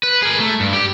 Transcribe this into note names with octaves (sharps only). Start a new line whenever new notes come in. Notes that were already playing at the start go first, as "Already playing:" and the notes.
B4
G#4 A#4
A3
G2
G4